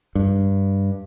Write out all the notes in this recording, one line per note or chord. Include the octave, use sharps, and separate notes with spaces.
G2